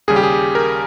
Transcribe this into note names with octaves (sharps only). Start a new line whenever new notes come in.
D#2 C#3 G3 G#4
G4
G#4
A#4